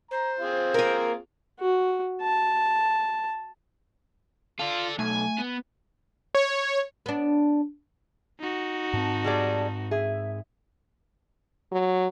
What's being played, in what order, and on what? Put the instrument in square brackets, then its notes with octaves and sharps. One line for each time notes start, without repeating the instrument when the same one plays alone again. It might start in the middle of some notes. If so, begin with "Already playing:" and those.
[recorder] C5 [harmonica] A#5
[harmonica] C4 F4 G#4
[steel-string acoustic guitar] A#3 A#4
[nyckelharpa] F#4
A5
[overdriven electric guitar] F4 [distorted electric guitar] A4 D5
[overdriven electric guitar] B1 [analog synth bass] A3 [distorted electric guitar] G#5
[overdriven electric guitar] B3
[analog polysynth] C#5
[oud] B3 D4
[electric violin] D#4 F#4
[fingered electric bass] G#2 C4 [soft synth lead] A5
[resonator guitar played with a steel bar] G3 G#4 D5
[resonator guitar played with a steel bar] G#4 [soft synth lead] E5
[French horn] F#3